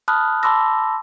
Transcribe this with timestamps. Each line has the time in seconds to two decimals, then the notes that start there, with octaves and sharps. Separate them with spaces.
0.08 A5 B5 D#6 F6 F#6
0.43 A5 B5 C6 D6 E6 A#6